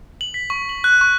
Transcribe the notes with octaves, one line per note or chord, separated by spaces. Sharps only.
F#7
B6
C#6
F#7
F#6
C#6